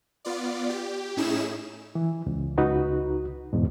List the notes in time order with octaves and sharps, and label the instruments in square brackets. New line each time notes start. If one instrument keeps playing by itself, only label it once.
[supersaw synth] B3 F4 D5
G4
A2 C#4 D#4 E4 G#4 E7
[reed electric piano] E3
C#2
C#2 D#4 F#4 B4
E2 G#2 B2